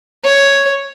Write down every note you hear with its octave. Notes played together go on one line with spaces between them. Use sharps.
C#5